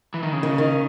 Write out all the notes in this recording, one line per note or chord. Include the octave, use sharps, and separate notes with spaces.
E3
D#3
C#3
D#3
D#3